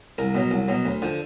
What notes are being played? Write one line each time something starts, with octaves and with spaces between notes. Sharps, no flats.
C2 A#4
B2 F#3
C2
B2 F#3
D2
D3 F3